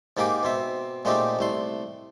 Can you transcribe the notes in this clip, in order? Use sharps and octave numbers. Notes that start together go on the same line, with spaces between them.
G#2 A#3 D#4 G4 G#4 D6
B2 C4 E5
A#2 G#3 A3 C4 D#4 G4
C2 A3 C6